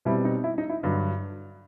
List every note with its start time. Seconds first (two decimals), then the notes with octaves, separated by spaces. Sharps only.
0.05 B2 G3 C4 E4
0.25 D#4
0.44 E4
0.58 D#4
0.70 E4
0.83 G2 D3 F#3